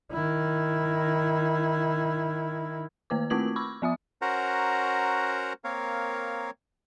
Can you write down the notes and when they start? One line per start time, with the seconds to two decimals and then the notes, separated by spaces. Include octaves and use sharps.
0.11 D#3 E4
3.10 D#3 A#3 B4 D6
3.30 A3 C4 E4 F4 G#6 F#7
3.56 B5 C#6 D6 E6
3.82 F3 B3 E5 D#6
4.22 C#4 F#4 A#4 C5 F#5 A#5
5.64 A#3 C4 A#4 C#5 F5